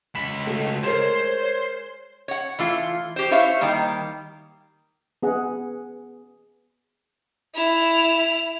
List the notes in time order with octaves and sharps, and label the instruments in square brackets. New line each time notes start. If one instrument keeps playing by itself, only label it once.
[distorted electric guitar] C#2 B5 [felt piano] E7
[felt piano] A3 F#4
[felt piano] G#3 A#4 [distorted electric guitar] C5 [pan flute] C#5
[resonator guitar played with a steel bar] C#5 F#5
E3 A3 F4
G4 C5
E4 C5 C#5 E5 F5
D#3 G3 A#3
[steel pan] B3 G#4 F#5
[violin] E4 F7